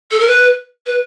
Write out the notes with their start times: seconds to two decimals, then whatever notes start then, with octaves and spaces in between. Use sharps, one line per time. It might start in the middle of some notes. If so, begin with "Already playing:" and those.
0.11 A4
0.20 A#4
0.27 B4
0.86 B4